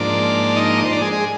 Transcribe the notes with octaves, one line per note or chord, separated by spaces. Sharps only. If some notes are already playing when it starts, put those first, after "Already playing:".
Already playing: G#2 F3 A#3 D4 D5
D#4 D#5
D5
C5
D4 D5
G#3 G#4
G#4